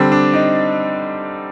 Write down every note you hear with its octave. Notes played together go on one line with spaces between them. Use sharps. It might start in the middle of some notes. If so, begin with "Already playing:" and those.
Already playing: D3 G3 C4
D4
D#4